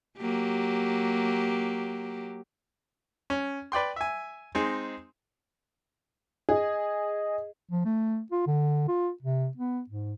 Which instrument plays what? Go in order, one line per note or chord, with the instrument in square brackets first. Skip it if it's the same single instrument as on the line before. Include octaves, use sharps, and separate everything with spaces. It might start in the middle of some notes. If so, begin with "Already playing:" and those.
[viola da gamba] F#3 A#3 G4
[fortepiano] C#4
B4 D5 G5 C6
E5 G#5
G#3 C4 D#4 G#4
[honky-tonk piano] G#4 [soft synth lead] D#5
[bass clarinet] F3
A3
F4
D3
F4
C3
B3
G#2